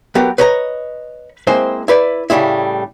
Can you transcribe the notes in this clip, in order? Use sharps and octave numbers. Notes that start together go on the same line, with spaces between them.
F#3 B3 G4 A#4
B4 C#5 D#5 G#5 A#5
G#3 A#3 C4 E4 C5
E4 B4 D5
A2 C#3 G3 G#3 E4